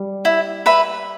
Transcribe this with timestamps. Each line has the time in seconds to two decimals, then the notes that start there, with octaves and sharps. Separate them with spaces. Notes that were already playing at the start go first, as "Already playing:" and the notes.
Already playing: G3
0.25 E4
0.66 B4 E5 B5